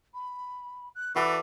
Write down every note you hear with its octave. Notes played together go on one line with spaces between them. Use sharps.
B5
F#6
E3 F#4 A4 D5 B5